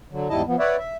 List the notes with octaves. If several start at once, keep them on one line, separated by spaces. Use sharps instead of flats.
D3 F#3
E2 G#2 G3 E4 D#5 A5
F3 B3
B4 C#5 D5 E5 F#5
E5